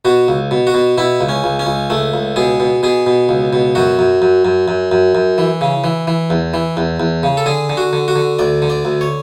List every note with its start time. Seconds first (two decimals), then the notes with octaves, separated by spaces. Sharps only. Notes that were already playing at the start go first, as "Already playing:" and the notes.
0.05 B2 F#4
0.28 C#2
0.51 B2
0.67 F#4
0.74 B2
0.98 B2 E4
1.21 C#2
1.29 C#4
1.44 C#2
1.59 C#4
1.67 C#2
1.90 C#2 A3
2.14 C#2
2.36 B2 G#4
2.60 B2
2.83 B2 G#4
3.06 B2
3.29 C#2
3.53 B2
3.75 F#2 F#4
3.99 F#2
4.22 F#2
4.45 F#2
4.68 F#2
4.92 F#2
5.15 F#2
5.38 E3
5.61 C#3
5.84 E3
6.07 E3
6.30 E2
6.54 E3
6.77 E2
7.00 E2
7.23 C#3
7.37 A4
7.46 D3 G#4
7.69 D3
7.77 F#4
7.93 D3
8.08 F#4
8.16 D3
8.39 D2 D5
8.62 D3
8.70 D5
8.85 D2
9.01 C#5